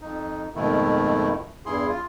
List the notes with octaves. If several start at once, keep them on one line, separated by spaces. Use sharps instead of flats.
F2 D#4
F2 G#2 B2 D#3 A3 E4
E2 G2 E4 G#4 C6
F4